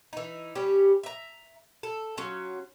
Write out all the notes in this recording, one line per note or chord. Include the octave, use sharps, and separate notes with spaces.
E3 D#4
G3 C#4 G4
E5 A#5
A4
F#3 C#4 F4